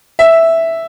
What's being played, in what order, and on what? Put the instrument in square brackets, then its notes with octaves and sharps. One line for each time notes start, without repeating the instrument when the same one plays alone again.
[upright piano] E5